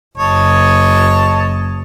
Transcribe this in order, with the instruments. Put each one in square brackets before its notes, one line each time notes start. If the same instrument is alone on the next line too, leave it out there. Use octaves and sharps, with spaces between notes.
[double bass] F#1 [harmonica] C#5 D#5 A5